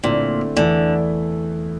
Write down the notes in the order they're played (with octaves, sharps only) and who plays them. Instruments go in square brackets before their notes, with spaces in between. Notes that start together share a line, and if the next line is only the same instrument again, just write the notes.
[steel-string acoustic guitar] A#2 [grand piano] D3 A3 C4 E4
[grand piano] E2 E3 A3 E4 [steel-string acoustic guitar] D3